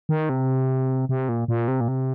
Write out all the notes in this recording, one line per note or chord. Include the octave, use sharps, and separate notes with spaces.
D#3
C3
C3
A#2
A#2
C3
A#2
C3